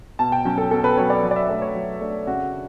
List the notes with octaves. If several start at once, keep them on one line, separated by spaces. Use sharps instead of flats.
B2 A5
G5
F#3 C#4
A4
B2 A4
B4
F#3 C#4 C#5
D5
F#3
D5
E5
A3 D4 D5
C#5
F#3
A3 D4
C#3 F#4
D4